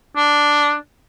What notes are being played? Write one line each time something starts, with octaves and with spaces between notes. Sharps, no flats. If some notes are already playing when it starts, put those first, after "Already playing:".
D4